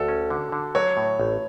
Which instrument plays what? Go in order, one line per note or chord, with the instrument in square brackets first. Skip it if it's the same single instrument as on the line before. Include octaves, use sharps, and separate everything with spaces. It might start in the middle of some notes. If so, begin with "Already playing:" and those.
Already playing: [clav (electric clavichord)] D2 [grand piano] F#4 A4
[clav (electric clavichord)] C#4
D3
D3
[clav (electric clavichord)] F#3 [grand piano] C#5
[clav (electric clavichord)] A2
A1